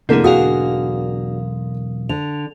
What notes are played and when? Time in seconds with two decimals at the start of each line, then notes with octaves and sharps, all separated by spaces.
0.09 B1 E2 D3 A#3 C4 E4 G#4
0.24 D4 F#4 G#4 A#4 F5 D#6
2.09 D3 F7